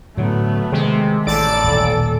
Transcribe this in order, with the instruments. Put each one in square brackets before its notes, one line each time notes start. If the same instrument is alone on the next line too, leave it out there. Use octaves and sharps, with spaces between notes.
[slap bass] A2 D3 [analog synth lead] F#3 [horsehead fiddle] A3 B3
[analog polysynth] C3 [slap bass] D#3 [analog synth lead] G#3
[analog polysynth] A1 D5 D7 [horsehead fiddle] A4 [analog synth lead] A6
[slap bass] D#1 B2